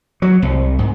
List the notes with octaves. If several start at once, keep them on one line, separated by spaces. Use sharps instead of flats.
F#3
C2
G#2